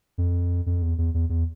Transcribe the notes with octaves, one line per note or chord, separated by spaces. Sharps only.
F2
F2
E2
E2
E2
E2